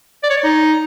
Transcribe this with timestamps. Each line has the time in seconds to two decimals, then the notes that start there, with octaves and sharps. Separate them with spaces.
0.23 D5
0.30 C#5
0.37 D5
0.44 D#4